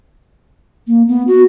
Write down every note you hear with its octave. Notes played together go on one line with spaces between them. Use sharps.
A#3
B3
F#4